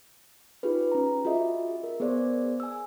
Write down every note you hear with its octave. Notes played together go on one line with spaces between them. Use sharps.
D#4 F4 G4 G#4 B4
C#4 A#5
F4 F#4 G#4 D#5 E5
A#4
B3 G#4 A#4 C5 D5
G#5 E6